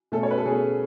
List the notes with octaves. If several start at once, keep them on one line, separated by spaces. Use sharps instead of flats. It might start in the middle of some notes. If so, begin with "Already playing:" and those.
B2 A3 C#4 A4
C#5
B4
A4
B2 A3 C#4 G#4